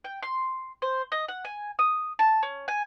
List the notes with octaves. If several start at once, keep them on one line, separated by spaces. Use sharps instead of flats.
G5
C6
C5
D#5
F#5
G#5
D#6
A5
C#4
G#5